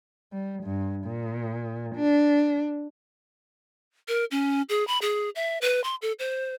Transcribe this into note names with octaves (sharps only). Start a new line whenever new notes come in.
G3
G2
A#2
D4
A#4
C#4
G#4
B5
G#4
E5
B4
C6
A4
C5